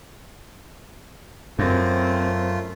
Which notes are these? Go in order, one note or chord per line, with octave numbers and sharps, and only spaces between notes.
F#2 A3 C4 F4